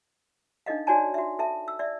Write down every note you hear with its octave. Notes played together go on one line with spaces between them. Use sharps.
D4 D#4 A4 D#5 F5
D#4 F#4 C#5 D5 G#5 A5
F#4 E5
A4 E5 A5
E6
D5 E5